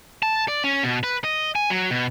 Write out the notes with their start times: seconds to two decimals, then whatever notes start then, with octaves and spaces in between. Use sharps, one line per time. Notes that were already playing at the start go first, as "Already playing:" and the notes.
0.23 A5
0.48 D5
0.64 C#4
0.83 B2
1.03 B4
1.24 D#5
1.55 G#5
1.70 F#3
1.91 B2